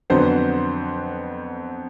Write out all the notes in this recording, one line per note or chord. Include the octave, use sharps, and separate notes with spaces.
F2 D3 F#3 B3 C5